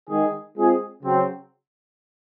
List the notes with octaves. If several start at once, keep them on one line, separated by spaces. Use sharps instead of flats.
D#3 G#3 D#4 G#4
G#3 C4 F4 G#4
C#3 F#3 C4